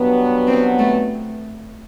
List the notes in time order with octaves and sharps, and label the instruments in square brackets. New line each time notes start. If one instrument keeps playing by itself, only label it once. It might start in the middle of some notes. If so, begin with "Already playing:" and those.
Already playing: [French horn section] G2 F#3 B3
[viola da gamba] C4
A3